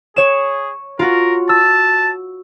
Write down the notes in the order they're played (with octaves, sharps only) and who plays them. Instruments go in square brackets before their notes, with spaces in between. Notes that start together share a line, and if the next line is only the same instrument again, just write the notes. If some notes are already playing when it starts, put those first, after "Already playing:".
[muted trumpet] G#4 [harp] C#5 E7
[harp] F4 F#4 [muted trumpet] A#4
[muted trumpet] A5 [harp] E6